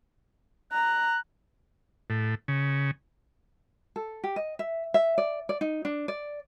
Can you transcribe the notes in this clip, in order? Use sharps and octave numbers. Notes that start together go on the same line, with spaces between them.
A#5 F#6
A2
C#3
A4
G4
D#5
E5
E5
D5
D5
D#4
D4
D5